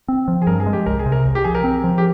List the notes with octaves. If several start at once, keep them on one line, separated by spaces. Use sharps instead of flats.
C4
F3
G#4
G2 A#4
G#4
G#3
G4
C2 A#4
G#4
C3
A#4
C2
G4
F3 G#4
A#4
C4
F3
G4